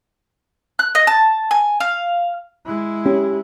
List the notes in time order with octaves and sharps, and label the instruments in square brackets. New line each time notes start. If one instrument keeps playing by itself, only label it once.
[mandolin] F#6
D#5
A5
G#5
F5
[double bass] G#3 E4
[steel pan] C#4 [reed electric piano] G4